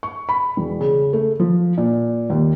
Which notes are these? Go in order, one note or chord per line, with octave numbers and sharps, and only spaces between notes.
C#6
B5
E1
C#3
A3
F3
A#2
D#2